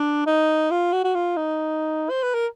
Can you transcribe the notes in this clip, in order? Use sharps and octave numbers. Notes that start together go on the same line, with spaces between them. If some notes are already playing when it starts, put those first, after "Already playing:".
Already playing: D4
D#4
F4
F#4
F#4
F4
D#4
C5
B4
A#4